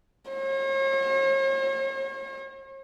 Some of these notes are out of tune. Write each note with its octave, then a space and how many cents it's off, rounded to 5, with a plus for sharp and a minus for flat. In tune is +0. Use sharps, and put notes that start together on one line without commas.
C#5 -45